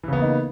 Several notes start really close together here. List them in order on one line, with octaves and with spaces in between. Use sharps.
E3 C#3 B3 A#3 D#4